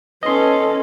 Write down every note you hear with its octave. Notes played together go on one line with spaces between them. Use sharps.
C#4 A4 B4 D#5 C6